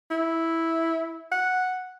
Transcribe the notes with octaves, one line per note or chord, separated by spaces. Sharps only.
E4
F#5